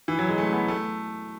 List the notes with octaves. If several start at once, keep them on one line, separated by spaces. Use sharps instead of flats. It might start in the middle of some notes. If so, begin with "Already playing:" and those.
E3
F#3
G#3
A3
B3
A3